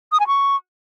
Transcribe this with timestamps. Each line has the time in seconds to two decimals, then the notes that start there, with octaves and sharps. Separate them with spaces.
0.12 D#6
0.20 G#5
0.27 C#6